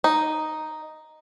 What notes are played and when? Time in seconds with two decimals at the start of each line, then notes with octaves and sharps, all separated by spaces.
0.04 D#4